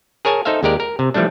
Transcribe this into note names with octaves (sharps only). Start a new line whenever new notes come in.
G#4 A#4 C#5 G#5 A5
D#4 A4 C5 E5 F5
D#2 G#3 G4 A#4 D5
A#4
C3
E3 F3 G3 A3 D4